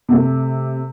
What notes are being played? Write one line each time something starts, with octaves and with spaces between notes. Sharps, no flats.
C3 A3